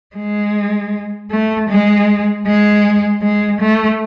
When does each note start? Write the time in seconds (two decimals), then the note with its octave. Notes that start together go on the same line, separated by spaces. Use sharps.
0.16 G#3
1.30 A3
1.69 G#3
2.46 G#3
3.22 G#3
3.61 A3